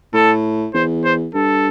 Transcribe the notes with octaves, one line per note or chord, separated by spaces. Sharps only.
A2 A4
E2 C5
C5
G2 A4